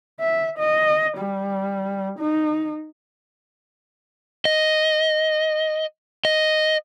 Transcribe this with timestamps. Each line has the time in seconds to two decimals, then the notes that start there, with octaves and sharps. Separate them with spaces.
0.20 E5
0.58 D#5
1.18 G3
2.19 D#4
4.45 D#5
6.25 D#5